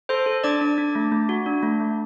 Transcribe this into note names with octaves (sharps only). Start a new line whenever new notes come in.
A4 C5 C6
A4
D4 D5 D6
D4
D4
A3
A3
F#4
D4
A3
A3